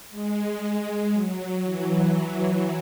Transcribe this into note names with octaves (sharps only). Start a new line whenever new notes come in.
G#3
F#3
E3